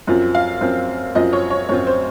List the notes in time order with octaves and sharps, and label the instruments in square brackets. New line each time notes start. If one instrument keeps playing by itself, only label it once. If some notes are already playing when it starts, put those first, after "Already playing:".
[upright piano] F#2 F3 C4 F4
F5
F#2 F3 C4 F4
F#2 F3 C4 F4 D#5
C#5
C#5
F#2 F3 C4 F4 C#5
C5